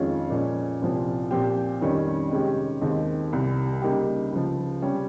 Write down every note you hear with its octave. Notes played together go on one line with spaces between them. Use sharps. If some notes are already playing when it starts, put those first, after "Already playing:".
Already playing: F2 D#3 G#3 C#4 F4
A#2 F3 G#3 C#4
C2 A#2 F3 C4
A#2 F3 C4 G4
F2 D#3 G3 C#4
C3 D#3 G#3 C#4 G4
D#2 D#3 G#3 C4
C2 C3 G3
C#3 G3 A#3 D#4 G4
C#2 C#3 F3
C3 G3 C#4 G4